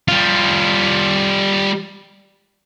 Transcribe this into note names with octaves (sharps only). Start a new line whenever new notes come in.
G3 F4